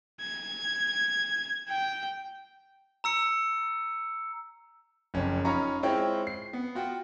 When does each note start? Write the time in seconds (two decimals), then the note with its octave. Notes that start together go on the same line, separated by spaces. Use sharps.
0.21 G#6
1.69 G5
3.04 A#5 E6 C#7
5.14 F#1 F2 C#4
5.45 C#4 D#4 F4 A#5 B5 C#6
5.83 G#3 C4 E4 F4 C#5 G5
6.27 C7
6.53 B3
6.75 F4 F#4 F#5 G5